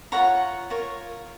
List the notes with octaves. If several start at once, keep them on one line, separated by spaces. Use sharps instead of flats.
F4 A#4 C#5 F#5 A#5
F4 A#4 C#5